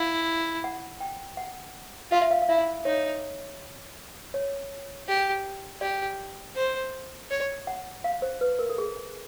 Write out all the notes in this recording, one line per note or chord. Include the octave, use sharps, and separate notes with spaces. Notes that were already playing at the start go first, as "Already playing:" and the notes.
Already playing: E4 F5
F#5
G5
F#5
F4 F5
E5
F5
F5
E4 E5
D#4 C#5
C#5
G4
G4 D5
C5
C#5
F#5
F5
C5
B4
A#4
A4
G#4